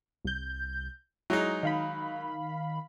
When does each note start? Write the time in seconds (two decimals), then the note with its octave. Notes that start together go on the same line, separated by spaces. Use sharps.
0.25 C2 G6
1.30 F#3 G#3 D#4 E4
1.63 D#3 F5 B5